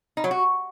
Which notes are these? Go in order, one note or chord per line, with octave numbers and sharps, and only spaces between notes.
D#4
F#3
F#4